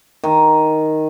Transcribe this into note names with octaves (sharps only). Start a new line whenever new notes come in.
D#3